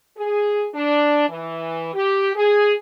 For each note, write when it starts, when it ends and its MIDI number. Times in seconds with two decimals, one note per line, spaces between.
0.17 0.68 68
0.75 1.26 62
1.29 1.94 52
1.94 2.30 67
2.36 2.74 68